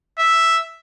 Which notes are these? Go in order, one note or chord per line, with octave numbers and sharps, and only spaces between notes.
E5